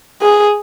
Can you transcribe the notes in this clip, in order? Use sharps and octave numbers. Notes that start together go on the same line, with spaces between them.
G#4